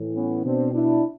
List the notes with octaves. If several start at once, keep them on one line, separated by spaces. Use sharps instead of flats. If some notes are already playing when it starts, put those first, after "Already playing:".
Already playing: A2 E3
B3 C#4
B2 C4 D4
D4 E4